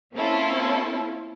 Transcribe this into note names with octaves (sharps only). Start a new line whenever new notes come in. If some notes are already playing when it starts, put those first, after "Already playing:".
A#3 C4 C#4 E4 F4 A4